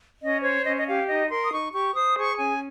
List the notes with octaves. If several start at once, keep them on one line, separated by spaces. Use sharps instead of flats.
C#4 D#5
C5 C#5
C#4 D#5
D#5
G4 F5
D#4 D#5
A#4 C6
D#6
D#4 C#6
G4 C#6
C5 D#6
G#4 C#6
C#4 G#5